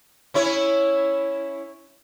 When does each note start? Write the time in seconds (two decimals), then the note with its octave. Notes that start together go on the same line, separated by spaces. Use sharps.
0.34 C#4 E4 C#5